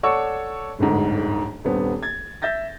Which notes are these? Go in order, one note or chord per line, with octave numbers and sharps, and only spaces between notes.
A4 C#5 D5 F#5 C#6 E6
D1 G1 D2 G#2
D#1 G2 B3 C4
G#6 A6
E5 G6 A6 A#6